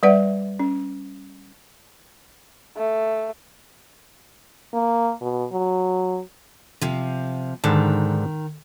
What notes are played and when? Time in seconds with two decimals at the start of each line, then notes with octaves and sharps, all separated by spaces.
0.03 G3 B4 D5 E5 F#5
0.60 C#4
2.77 A3
4.73 A#3
5.21 B2
5.52 F#3
6.81 C3 F3
7.64 G#2 D3 D#3 A5